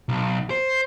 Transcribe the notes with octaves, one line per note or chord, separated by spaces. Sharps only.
B1
C5